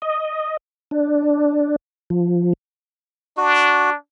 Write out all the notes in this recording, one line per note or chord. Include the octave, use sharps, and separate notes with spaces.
D#5
D4
F3
D4 F#4